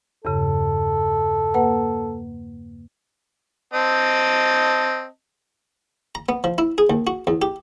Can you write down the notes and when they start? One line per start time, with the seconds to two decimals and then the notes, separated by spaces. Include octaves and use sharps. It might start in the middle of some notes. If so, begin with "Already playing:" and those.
0.25 E2 G2 C#3 A4
1.54 A#3 B4 F#5
3.73 C4 D#5 A5
6.15 A#5
6.29 B3
6.44 F3
6.58 E4
6.78 G#4
6.90 D#2
7.07 F#4
7.27 E2
7.42 G4